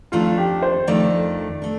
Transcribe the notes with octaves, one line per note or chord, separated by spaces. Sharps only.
F2 D#3 A3 D4 F4
G4
C5
F2 D#3 A3 D4 D5
A3 D4